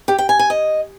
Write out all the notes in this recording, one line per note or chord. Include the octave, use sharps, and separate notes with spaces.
G4
G5
G#5
G#5
D#5